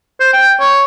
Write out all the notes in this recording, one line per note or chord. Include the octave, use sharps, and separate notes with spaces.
C5
G5
C#5